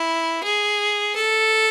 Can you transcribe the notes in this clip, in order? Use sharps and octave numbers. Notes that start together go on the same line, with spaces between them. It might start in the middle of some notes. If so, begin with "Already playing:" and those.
Already playing: E4
G#4
A4